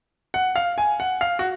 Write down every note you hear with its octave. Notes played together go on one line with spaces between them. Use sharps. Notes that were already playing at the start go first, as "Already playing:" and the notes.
F#5
F5
G#5
F#5
F5
F#4